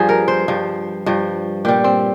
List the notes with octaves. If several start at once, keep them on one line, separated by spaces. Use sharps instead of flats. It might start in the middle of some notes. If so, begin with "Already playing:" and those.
Already playing: G2 F3 G#4
A#4
C5
G2 F3
G2 F3
A#2 G3 G4
C4